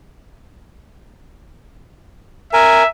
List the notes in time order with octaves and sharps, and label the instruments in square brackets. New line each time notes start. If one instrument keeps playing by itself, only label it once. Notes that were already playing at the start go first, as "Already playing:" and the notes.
[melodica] A#4 G#5 [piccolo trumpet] E5